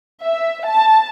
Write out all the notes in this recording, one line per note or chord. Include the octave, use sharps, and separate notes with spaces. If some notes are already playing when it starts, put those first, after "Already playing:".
E5
A5